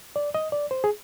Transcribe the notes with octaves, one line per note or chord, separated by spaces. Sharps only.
D5
D#5
D5
C5
G#4